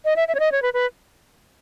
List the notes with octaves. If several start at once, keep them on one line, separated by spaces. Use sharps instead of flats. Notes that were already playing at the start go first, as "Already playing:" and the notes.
D#5
E5
E5
C#5
D#5
C#5
B4
B4